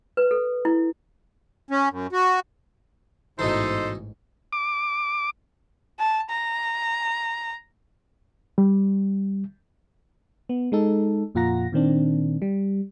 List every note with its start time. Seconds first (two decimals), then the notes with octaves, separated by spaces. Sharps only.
0.17 B4
0.31 A4
0.65 E4
1.70 C#4
1.90 F#2
2.12 F#4
3.39 A1 G#2 B2 E3 D#4 A4 C5
4.53 D6
5.99 A5
6.29 A#5
8.58 G3
10.49 B3
10.72 G#3 D#4 A4
11.35 F2 A#2 F4 F#5 A#5 A#6
11.72 A#2 D#3 C4 D4
12.42 G3